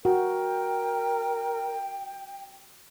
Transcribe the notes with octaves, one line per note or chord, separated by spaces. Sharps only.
F#4 A#4 G5